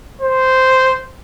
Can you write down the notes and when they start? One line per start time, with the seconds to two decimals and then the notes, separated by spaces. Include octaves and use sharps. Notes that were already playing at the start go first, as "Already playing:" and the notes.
0.22 C5